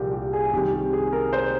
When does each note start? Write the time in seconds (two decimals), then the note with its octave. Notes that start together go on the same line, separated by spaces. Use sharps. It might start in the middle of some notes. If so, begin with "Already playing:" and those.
Already playing: C2 A#2 F3 G4 G#4 A#4
0.13 G4
0.33 G#4
0.53 C2 C3 D#3 G4
0.73 G4
0.93 G#4
1.13 A#4
1.33 C5